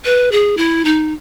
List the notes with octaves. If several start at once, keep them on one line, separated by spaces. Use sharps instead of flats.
B4
G#4
E4
D#4